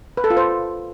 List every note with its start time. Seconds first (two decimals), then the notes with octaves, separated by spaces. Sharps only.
0.17 B4
0.24 A4
0.30 F4
0.37 C5